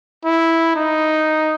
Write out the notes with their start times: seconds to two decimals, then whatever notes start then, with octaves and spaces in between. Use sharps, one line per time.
0.25 E4
0.76 D#4